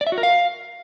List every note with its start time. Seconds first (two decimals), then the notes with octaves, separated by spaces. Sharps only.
0.01 D5
0.07 E5
0.12 F#4
0.18 A#4
0.23 F5